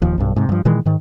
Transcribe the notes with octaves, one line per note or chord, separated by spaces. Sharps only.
D#1 D#2 F3
B1 G2
G#2 C3
G2 F3
A#2 D#3 E3 G#3
G#2 D#3